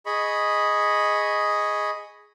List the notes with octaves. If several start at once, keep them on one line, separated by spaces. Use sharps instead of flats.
G#4 D#5 B5 C#6